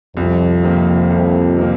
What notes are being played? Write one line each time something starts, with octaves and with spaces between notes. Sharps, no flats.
C2 F2
C3 D#3 A#3
C2
C3 D#3 A#3